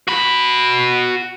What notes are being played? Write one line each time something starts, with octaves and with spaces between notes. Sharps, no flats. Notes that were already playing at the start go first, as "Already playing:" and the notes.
F#4 B5